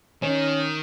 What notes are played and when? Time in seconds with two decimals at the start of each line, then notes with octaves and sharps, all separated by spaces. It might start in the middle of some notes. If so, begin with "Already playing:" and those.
0.22 D#3 C#4